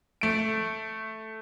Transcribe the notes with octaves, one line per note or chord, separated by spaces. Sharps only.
A3 D7